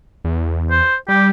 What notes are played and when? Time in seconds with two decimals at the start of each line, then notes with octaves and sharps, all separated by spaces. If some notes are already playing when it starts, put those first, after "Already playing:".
0.25 E2
0.71 C5
1.08 G3 G4